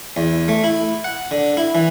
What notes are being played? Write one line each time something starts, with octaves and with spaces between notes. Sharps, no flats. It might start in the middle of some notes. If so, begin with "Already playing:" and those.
E2
A3
E4
F#5
D3
E4
E3